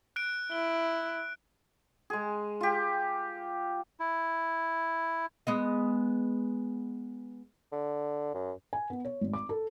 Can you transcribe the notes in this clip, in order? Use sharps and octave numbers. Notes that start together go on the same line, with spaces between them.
F#6 D7
E4 G7
G#3 G#4
F4 G4
E4
G#3 B3 D#5
D3
F#2
G#5
B3
C#5
G#1
D6
A4